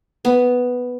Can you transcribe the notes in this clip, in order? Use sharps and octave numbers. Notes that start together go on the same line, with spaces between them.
B3